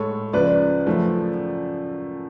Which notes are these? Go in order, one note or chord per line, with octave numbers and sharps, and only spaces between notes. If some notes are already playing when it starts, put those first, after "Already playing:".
Already playing: A2 G#3 A4 C#5
C#2 C#3 F3 B4 D5
F#2 C#3 F3 A3